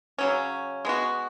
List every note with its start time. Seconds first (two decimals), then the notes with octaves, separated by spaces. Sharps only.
0.18 C#3 F#3 C#4
0.85 G#3 B3 F#4